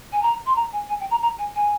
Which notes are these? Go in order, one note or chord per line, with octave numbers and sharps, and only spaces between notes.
G#5
A#5
C6
A#5
G#5
G#5
G5
A#5
A#5
G#5
G#5